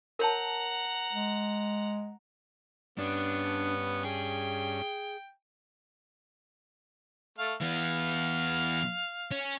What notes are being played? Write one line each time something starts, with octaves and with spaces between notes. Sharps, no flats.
A#4 C#5 F#5 A5 A#5
G#3
G2 B3 C#4 D4
G#4 G5
A3 F5
E3 B3 F5
C#4